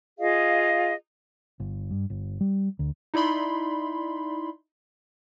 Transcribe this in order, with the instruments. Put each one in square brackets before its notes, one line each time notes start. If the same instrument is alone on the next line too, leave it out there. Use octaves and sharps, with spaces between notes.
[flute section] F4 G#4 D#5 F5
[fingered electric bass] G1
G2
G1
G3
D2
[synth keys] D#4 E4 D5 B5 C6